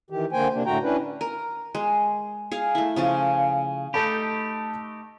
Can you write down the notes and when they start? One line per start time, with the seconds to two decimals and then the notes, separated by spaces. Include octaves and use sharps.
0.10 D#3 E3 G4
0.32 D3 A#3 C5 G5 G#5
0.53 C3 A#3 D4
0.66 A2 D3 A3 F#4 G5 A#5
0.83 C#4 D4 E4 B4
1.21 A#4
1.75 G#3
2.52 G#4 F5
2.75 A3 E4
2.96 C#3 F3 C#4
3.94 A3 D#4 G4 A4 A5 B5